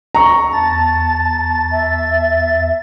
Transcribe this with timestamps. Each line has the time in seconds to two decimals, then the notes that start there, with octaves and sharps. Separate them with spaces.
0.15 A#5 C#6
0.53 E2 A5 A6
1.71 E5